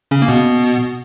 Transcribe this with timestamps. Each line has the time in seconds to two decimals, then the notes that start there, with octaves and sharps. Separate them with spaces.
0.11 C#3 C#4
0.22 A#3
0.28 B2 B3